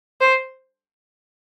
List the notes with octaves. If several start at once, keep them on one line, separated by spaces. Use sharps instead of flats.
C5